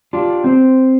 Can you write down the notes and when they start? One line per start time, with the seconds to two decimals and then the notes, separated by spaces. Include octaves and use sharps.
0.13 D4 F4 G4
0.44 C4 C5